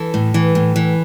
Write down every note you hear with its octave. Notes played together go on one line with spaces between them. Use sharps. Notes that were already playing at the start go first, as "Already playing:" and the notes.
Already playing: E3 A4
A2
E3
A2
E3